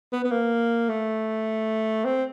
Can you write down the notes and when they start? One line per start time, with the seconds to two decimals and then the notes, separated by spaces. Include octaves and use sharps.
0.13 B3
0.24 B3
0.31 A#3
0.89 A3
2.05 C4